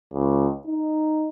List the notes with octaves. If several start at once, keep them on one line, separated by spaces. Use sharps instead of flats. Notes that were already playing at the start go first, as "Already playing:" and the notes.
C#2
D#4